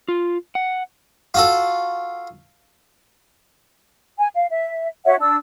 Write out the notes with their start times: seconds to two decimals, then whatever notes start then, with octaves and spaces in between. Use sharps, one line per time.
0.08 F4
0.55 F#5
1.34 F4 F#4 A4
4.17 G#5
4.34 F5
4.51 E5
5.05 F#4 C#5 E5 F#5
5.20 D4 E6